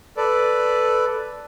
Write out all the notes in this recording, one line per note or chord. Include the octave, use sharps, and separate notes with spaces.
A4 B4 D5